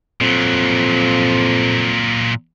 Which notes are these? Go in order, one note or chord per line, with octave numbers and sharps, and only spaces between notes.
F2 A#2 F#3